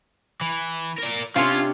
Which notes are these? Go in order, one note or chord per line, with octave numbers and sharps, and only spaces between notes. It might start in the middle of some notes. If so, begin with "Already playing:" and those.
E3
A#4 D5
C3 C#4 D4 F4 C#5